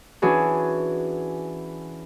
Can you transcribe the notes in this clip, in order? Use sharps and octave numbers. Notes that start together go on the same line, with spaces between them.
E3 C#4 D4 F#4 G#4